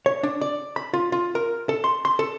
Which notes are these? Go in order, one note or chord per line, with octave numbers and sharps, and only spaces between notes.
C#5
D4
D5
B5
F4
F4
A#4
A4
C6
C6
A4